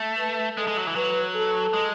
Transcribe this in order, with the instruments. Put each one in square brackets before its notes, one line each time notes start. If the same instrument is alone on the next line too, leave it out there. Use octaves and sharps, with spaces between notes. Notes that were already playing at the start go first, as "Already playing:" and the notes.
Already playing: [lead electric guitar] A3
[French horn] B4
[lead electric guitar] G#3 [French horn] A4
[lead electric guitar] G#3
F#3
E3
[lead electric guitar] F#3 [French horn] B4
[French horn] A4
[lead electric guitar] G#3